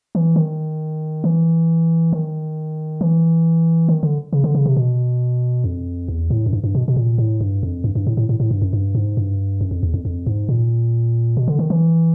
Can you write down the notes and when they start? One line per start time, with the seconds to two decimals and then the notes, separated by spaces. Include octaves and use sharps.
0.15 E3
0.36 D#3
1.24 E3
2.13 D#3
3.01 E3
3.89 D#3
4.03 D3
4.33 C#3
4.44 D3
4.55 C#3
4.66 C3
4.76 B2
5.64 F2
6.08 E2
6.30 A2
6.46 F#2
6.53 G2
6.64 G2
6.75 B2
6.88 B2
6.96 A#2
7.18 A2
7.41 G2
7.63 F2
7.84 G2
7.95 G2
8.07 A2
8.17 A2
8.29 A2
8.40 A2
8.51 G2
8.62 F#2
8.73 G2
8.95 G#2
9.17 G2
9.61 F#2
9.71 F2
9.83 E2
9.94 F2
10.05 F2
10.26 G#2
10.49 A#2
11.37 B2
11.48 D3
11.59 D#3
11.70 E3